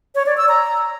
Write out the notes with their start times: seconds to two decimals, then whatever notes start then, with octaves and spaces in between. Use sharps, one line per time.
0.15 C#5
0.26 D5
0.37 E6
0.48 A#5